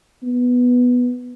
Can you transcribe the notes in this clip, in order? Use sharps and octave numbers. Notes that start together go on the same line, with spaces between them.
B3